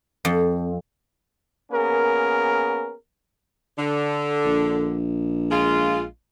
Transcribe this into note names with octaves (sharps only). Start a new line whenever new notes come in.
F2
A#3 B3 C#4 G#4 A#4
D3
A#1
G#3 F4